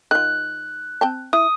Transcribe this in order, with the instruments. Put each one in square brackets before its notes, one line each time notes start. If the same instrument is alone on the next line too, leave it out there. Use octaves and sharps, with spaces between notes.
[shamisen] D#3 F4 [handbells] F#6
[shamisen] C4 G5 A5
[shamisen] E4 [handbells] D#6